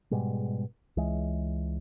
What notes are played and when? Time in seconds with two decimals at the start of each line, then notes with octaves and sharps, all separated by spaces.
0.11 G#2 B2 G3 G#3
0.97 C#2 E3 G#3